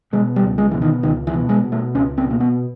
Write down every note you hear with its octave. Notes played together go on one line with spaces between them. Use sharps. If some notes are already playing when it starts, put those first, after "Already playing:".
B2 G#3
G3
C#2
G#3
B2 E3
D#3
C#2 D#3
E3
B2
G#3
B2
A3
C#2 C#4
C4
B2 A#3
B3